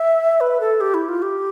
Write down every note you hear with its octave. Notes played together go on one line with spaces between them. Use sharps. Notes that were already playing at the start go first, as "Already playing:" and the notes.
Already playing: E5
B4
A4
G4
E4
F4
G4